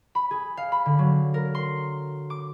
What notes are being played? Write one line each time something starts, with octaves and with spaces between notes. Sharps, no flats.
B5
G#4
F5
B5
D3
F#3
A#4
C6
D6